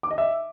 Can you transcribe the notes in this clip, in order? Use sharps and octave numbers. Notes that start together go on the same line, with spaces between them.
D6
D#5
E5